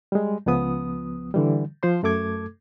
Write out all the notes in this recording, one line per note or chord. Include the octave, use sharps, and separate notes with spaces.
G3 G#3
C#2 F3 B3 D#6
D3 E3 G3
F3 C5 C6
F#2 A3 A4 D6 G#6